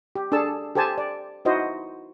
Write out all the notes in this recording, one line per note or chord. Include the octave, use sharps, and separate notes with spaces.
G4
D4 G#4 A4 A5 E6
G4 A4 C5 G#5 A5
D5
D#4 E4 F#4 C5 D#5